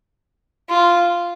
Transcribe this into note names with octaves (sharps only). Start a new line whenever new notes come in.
F4